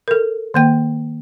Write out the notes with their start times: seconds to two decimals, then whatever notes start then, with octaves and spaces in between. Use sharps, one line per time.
0.08 A4 A#4
0.54 D#3 A#3 G5